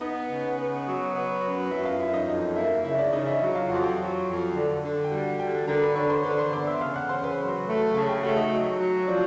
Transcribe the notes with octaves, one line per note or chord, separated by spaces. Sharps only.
B3 D#4 D#5
C#3
B3
F#3
B3
F#2
F#2 E4 E5
F4 F5
F#2 E4 E5
D#4 D#5
F2 D#4 D#5
A#3 E4 E5
C#3 E4 E5
D4 D5
C#3 D#4 D#5
E4 E5
F#3
F4 F5
F2 F#4 F#5
G4 G5
F#3
F2
D3
D3
G5
G3 F#4 F#5
D3 G4 G5
D3 A#4 A#5
B4 B5
D3 C#5 C#6
C5 C6
D3 B4 B5
C5 C6
B3 D5 D6
E5 E6
C#3 F5 F6
F#5 F#6
C#3 C5 C6
B4 B5
F#3
A3
C#3 A4 A5
G4 G5
A3 F#4 F#5
D#4 D#5
F#3
F#3
F3 D4 D5